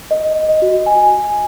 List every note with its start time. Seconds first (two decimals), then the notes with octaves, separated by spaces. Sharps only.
0.11 D#5
0.49 D#5
0.62 F#4
0.86 G#5